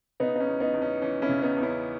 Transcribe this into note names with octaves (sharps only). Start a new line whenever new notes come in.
C#3 B3 D#4
D#4
C#4
E2
B3 D#4
E2
C#4
E3 C#4
C#4 E4
C#3
B3 D#4
E2
C#4 E4